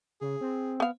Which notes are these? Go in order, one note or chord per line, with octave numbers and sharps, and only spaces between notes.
C#3 G#4
C4
B3 F5